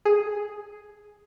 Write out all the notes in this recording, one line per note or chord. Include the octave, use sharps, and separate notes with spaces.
G#4